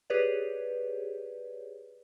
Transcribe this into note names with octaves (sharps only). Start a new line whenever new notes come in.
G4 G#4 B4 C#5 D5